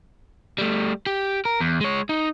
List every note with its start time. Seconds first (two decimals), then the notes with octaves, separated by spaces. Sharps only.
0.58 G3 A3
1.07 G4
1.45 A#4
1.60 E2
1.81 G#3 C#5
2.09 D#4